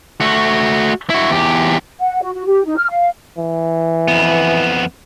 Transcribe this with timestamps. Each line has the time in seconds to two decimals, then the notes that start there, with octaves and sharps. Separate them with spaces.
0.21 A3 F#4
1.10 E4 F#4
1.30 E2 G4
2.00 F#5
2.22 F#4
2.34 F#4
2.46 G4
2.65 D#4
2.77 F6
2.89 F5
3.38 E3
4.08 F2 B3